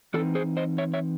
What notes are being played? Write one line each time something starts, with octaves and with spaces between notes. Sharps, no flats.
E3 C4 D#4 F#4 A4
G#4 C5
C5 D#5
C#5 E5
C#5 E5